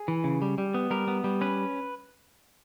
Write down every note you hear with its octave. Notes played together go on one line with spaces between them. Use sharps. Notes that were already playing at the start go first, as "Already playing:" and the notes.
Already playing: G#4
E3
C#3
G3
G3
B3
G3 A#4
B3
G3
C#4 B4